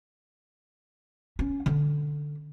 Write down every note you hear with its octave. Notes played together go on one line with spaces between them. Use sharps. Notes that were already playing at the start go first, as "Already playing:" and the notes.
C#4
D3